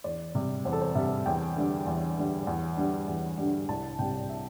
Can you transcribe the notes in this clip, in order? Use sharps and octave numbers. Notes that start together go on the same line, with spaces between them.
E2 D5
C3 G3
E2 C5
A4
C5
C3 G3 E5
E2 G5
D3 G3
E2
D3 G3
E2
D3 G3
E2
D3 G3
C2 A5
C3 G3 G5
E5